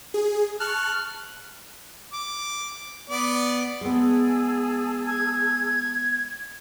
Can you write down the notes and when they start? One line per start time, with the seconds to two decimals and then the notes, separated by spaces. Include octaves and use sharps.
0.14 G#4
0.60 A5 C#6 F6 F#6
2.13 D6
3.10 B3 D5
3.81 G#3 B3 G#4 A5 E6
5.07 G#6